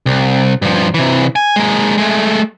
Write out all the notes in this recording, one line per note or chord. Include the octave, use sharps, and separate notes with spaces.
C2
G2 F3
C3 E3
G#5
G#3 A#3
G#3 A3